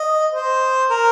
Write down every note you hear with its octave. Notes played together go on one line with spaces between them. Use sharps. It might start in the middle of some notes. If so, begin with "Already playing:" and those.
Already playing: D#5
C5
A#4